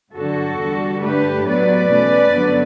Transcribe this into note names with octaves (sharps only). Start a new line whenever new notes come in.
G2 D3 F#3 F#4 A4
E2 D3 G3
G2 D3 A3 D4 G4 B4
A2 F#3 B3 B4 D5
E2 B2 A3 C#4
G2 D3 F#3 B3 D4